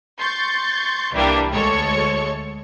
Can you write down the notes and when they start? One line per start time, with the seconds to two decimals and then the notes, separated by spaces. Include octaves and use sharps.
0.19 C6 C#6 G6 A6
1.12 C2 E3 G3 A#3 D4
1.51 D2 G#3 A4 C#5 C#6 C#7